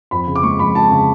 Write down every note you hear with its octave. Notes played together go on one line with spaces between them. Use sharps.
F2 B5
C#3
D6
G#3 C#6
F2 B5
F2 A5
C#3